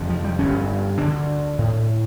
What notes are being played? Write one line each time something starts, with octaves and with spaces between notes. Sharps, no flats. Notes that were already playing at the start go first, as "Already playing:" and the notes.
Already playing: F1 F2 D3
F3
G3
G1 G2 D3 C#4
D2 D3 D4
A2